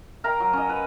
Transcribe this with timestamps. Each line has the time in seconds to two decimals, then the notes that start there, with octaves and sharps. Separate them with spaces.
0.24 A#4 F5 G5 A#5
0.40 F#3
0.53 C#4 D#5
0.69 B4